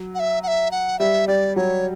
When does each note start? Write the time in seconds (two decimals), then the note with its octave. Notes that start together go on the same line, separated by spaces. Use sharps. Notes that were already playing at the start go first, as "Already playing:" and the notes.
Already playing: F#3
0.15 F#5
0.20 E5
0.43 F#5
0.48 E5
0.71 F#5
0.99 G3 E5
1.28 G3 D5
1.56 F#3 C#5